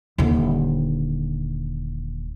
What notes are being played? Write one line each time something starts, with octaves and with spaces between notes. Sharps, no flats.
D#1 D3